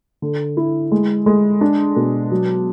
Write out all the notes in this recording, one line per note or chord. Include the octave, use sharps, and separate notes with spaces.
D3
E4
G#3
G#3
D4
B2
F#3